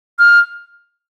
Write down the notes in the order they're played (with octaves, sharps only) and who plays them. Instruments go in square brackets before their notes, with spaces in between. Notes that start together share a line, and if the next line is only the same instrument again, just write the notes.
[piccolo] F6